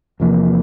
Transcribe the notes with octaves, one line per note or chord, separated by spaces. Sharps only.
E2 C3 F3 A#3